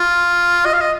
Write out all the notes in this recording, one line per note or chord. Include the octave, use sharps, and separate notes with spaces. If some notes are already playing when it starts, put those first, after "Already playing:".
Already playing: F4
D#5
F5
D#5